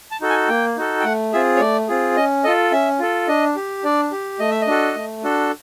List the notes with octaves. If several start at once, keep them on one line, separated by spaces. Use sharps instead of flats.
A5
D#4 F#4 A4
G#5
A#3 G5
D#4 F#4 A4
G5
A3 F#5
C4 F4 G#4 E5
C#5
A3 D5
C4 F4 G#4
C#4 D#5
F4 A4 D#5
C#4 E5
F4 A4
D4 D#5
G4
D4 D5
G4
A3 D#5
E5
D#5
D4 F#4 A4
A3
D4 F#4 A4